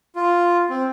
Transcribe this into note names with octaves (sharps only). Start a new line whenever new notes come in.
F4
C4